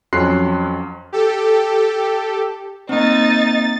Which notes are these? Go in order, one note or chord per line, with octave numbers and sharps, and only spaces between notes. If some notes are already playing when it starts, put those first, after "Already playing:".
F2 F#3 C#4 C6 F#6 C7
G4 A4
A#3 C4 D#4 A6